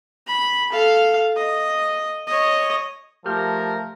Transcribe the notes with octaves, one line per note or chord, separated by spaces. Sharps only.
B5
A4 F5
D#5
C#5 D#5
F3 A3 G4 A#4 F6 G6